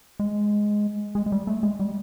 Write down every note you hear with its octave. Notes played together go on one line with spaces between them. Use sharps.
G#3
G#3
G#3
G3
A3
G#3
G3